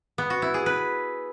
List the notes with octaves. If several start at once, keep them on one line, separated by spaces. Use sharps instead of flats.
B3
F#4
E4
G#4
B4